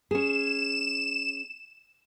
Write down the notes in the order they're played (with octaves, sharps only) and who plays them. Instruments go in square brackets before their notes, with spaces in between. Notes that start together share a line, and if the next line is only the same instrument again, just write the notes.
[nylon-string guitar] C#4 G#4 [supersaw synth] E7